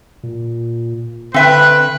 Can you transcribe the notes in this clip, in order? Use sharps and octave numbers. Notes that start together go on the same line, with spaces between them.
A#2
D3 C4 B4 E5 G5